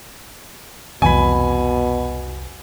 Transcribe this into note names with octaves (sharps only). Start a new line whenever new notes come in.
C2 F2 B2 E3 F#3 G#5 B5